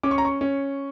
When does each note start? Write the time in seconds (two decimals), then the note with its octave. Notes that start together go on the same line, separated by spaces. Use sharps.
0.03 C#4 D6
0.11 C#6
0.18 A#5
0.25 C#6
0.41 C#4